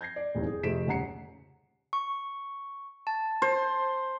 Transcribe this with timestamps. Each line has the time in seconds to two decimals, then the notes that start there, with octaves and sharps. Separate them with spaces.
0.01 G6 G#6 A#6 C7
0.16 D5
0.35 D#1 E2 D#3 C4
0.46 G#4
0.63 F2 C3 A3 B6 D7 E7
0.87 D#1 C#3 F#5 A#5 C7 C#7
1.93 C#6
3.07 A5
3.42 C5